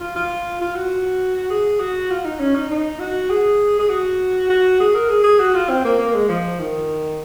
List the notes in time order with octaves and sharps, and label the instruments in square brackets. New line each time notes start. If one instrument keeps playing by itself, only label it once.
[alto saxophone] F4
F4
F4
F#4
G#4
F#4
F4
D#4
C#4
D#4
D#4
F#4
G#4
G#4
F#4
F#4
G#4
A#4
G#4
G#4
F#4
F4
C4
A#3
A#3
G#3
F3
D#3